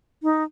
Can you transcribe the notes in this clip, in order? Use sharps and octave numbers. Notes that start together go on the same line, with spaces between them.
D#4